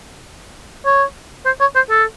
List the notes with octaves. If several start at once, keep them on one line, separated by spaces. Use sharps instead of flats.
C#5
C5
C#5
C5
A4